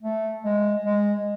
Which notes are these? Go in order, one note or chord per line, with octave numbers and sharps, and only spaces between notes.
A3
G#3
G#3